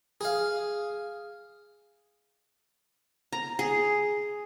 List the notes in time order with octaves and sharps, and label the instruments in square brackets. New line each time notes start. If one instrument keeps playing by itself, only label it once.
[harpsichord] G#4 F5
[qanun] A#5
G#4